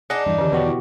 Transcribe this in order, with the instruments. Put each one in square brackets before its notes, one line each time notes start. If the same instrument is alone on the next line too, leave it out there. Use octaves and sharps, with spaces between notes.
[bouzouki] D4 D#4 [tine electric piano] G#4 D#5 F#5
[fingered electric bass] E2 E3 [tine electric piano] G2
[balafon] D3 D#3 G4 [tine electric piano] C#4
[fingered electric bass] E2 [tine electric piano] B2 F#4 G4 [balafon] B4 C#5
[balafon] E4